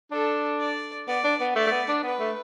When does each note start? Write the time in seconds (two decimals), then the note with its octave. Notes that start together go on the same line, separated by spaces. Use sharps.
0.11 D4 A4
0.60 D5
1.08 B3 D5
1.24 D4
1.41 B3
1.55 A3 D5
1.67 A3
1.71 B3
1.88 D4
2.03 B3 B4
2.20 A3